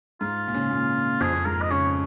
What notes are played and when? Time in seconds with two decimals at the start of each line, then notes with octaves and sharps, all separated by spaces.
0.21 G#2 F4
0.48 A#2
0.54 C#3
0.71 A#2
1.20 F2 G#4
1.33 F2
1.45 G#2 A#4
1.62 D#5
1.70 C#3 C#5